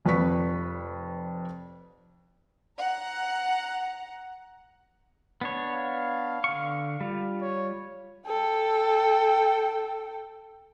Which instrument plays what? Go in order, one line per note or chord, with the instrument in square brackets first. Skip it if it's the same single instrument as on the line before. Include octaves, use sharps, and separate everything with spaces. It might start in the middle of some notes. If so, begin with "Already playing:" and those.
[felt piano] F1 F2 B4 D5 C#6 B6
[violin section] F#5 A#5
[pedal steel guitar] B3 D4 C#5
[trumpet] F5
[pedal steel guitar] D3 C#6
G3 F4
[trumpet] C#5
[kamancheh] A4 G5